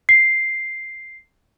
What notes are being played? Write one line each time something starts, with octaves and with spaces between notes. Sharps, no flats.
C7